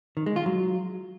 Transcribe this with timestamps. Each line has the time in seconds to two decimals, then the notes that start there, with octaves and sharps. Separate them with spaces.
0.17 D#3
0.26 G#3
0.36 F4
0.46 F#3